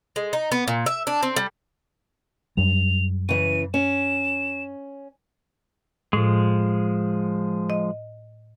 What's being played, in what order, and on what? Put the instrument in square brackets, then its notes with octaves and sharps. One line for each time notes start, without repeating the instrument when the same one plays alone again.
[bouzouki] G#3
D#4
B3
A#2
E5
D4
C4
G3
[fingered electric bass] F#2 G3 [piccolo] F7
[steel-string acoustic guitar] C#3 E3 [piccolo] D#7
[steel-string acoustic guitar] C#4 [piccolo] E7
[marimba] A2 [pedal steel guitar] F3 G#3
[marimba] D#5